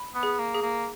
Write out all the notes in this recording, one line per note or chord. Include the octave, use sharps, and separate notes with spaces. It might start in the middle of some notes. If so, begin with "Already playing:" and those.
Already playing: B5
B3
G#4
A#3
G#4
A#3